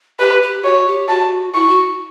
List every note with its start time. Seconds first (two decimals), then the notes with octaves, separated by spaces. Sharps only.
0.20 G4 B4
0.42 G4
0.64 F#4 C#5
0.87 G4
1.09 F#4 A5
1.54 E4 C#6
1.69 F#4